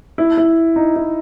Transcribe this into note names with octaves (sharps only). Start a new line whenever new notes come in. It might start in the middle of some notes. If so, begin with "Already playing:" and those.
E4
E4
D#4
E4